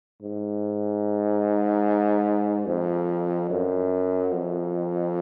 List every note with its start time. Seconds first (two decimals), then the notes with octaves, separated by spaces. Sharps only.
0.22 G#2
2.67 F2
3.50 F#2
4.32 F2